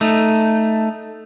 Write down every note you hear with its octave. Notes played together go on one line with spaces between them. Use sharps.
A3 D#4